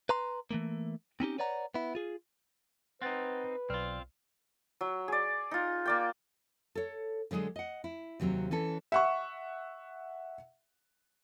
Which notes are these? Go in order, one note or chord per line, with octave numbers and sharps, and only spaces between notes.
B4 A#5 C6
E3 A3 A#3
C4 C#4 D#4 G4
B4 C#5 D5 F#5 A#5
B3 E4
F4 G#4
C4 D#4 B4 F#5 F#6 A6
B1 C4 F4 D5 F6
F#3
G#4 D5
D#4 F4
A#3 D5 G5
A4 C#5
D3 F#3 G#3 F4 G#4
D#5 F#5
E4
D#2 C3 F#3 C4
E3 C#4 A4
E5 F#5 C#6